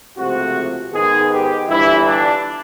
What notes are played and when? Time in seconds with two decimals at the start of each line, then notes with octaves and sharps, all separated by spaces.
0.16 C#2 C3 F3 A3 F#4
0.93 G#2 D#3 G#3 B3 G#4
1.31 G4
1.68 G1 G2 E3 E4
2.07 D4